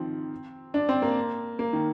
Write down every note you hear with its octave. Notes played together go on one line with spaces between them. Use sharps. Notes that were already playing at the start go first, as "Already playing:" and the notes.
Already playing: D#3 F3 C4
D4
C4
A#3
A#3
D#3